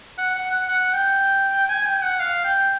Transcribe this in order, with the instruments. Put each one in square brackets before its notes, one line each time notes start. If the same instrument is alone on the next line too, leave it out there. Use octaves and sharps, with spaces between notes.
[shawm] F#5
F#5
F#5
F#5
G5
G#5
G5
F#5
F5
G5